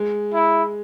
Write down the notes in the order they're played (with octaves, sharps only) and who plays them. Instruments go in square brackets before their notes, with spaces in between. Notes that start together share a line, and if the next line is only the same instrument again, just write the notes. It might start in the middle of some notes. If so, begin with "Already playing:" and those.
Already playing: [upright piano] G#3
[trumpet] E4